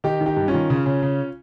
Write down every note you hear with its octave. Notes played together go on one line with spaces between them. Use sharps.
D#3 D#4 G4
D#3
D#4 G4
G2
C#4 F4
D#3
C#3
C#3
C#3